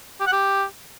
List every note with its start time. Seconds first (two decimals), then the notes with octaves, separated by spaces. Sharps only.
0.20 G4
0.27 F#5
0.33 G4